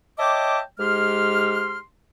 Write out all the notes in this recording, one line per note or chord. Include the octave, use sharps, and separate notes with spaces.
C#5 D#5 E5 G5 A5 D6
G#2 G#3 G4 C6 F6